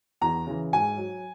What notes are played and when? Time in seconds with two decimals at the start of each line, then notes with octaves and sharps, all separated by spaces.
0.21 E2 A#5
0.47 C#3 E3
0.73 G#2 G#5
0.97 F#3